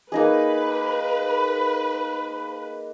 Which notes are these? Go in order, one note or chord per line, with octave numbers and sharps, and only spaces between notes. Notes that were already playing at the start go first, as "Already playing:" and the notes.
A#3 D#4 G#4 B4